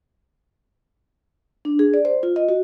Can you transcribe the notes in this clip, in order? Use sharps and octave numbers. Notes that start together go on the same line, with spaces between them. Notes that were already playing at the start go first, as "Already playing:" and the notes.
D4
G#4
D5
C5
F4
D#5
F#4